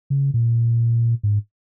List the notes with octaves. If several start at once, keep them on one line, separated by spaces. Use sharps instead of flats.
C#3
A#2
G#2